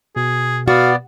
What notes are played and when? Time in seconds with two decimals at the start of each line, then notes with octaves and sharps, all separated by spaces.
0.16 B2 G#4
0.68 B3 F#4 D5 F5